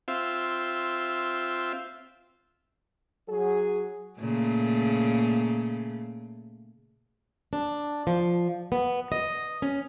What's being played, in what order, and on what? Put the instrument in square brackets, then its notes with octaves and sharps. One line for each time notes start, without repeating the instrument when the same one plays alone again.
[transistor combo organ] C4 F4 E5
[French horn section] F#3 G#4
[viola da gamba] A#2 C#3 A3
[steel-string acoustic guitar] D4
F3
B3
D#5
C#4